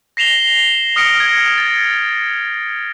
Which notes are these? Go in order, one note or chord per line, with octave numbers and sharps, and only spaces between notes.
A#6 C7 E7 F7 G7
D#6 F6 A#6 C#7 D7
G#6
A6